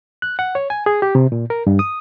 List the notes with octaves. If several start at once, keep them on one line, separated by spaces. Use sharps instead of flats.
F#6
F#5
C#5
G#5
G#4
G4
C3
A#2
A#4
G2
D#6